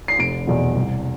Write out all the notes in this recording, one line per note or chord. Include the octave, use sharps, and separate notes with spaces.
C7
F1 D7
E2 B2
C2